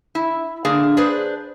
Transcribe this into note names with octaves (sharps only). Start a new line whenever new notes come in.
E4
D3 A#3 D4 G#4
D4 G#4 B4 C5